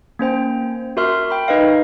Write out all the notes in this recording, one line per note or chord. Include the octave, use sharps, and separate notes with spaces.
A#3 C#4 C5 G5
F#4 A#4 E5 C6 F6
G5 B5
D#4 B4 D#5 F5